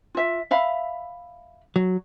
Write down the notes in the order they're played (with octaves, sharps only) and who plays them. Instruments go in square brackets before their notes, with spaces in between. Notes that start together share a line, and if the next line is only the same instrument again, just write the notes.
[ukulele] F4 E5
E5 F5 B5
[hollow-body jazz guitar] F#3